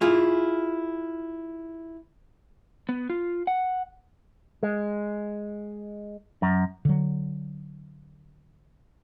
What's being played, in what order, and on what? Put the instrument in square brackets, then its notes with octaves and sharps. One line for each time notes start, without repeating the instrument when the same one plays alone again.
[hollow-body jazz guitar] E4 F4 G#4
[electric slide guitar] B3
F4
F#5
[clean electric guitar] G#3
F#2
[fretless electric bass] D3 F#3